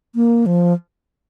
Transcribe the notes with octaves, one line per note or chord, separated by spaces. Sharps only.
A#3
F3